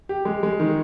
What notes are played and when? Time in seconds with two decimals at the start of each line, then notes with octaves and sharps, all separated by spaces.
0.09 G4
0.25 G#3
0.43 G#3
0.60 D#3